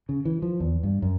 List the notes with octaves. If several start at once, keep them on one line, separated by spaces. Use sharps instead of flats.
C#3
E3
F3
E2
G2
F#2